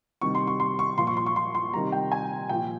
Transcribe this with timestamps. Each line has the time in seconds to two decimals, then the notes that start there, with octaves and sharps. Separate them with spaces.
0.21 C3 D#3 G3 C#6
0.35 C6
0.47 C#6
0.60 C6
0.79 C#6
0.98 A#2 F3 C6
1.07 C#6
1.17 C6
1.26 C#6
1.36 C6
1.55 C6
1.74 C3 D#3 G3 A#5
1.92 G5
2.12 G#5
2.49 A#2 F3 G5